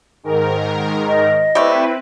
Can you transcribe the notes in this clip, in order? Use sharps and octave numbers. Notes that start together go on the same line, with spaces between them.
G#2 D#3 A#4
D#5
G3 A3 C4 E4 B4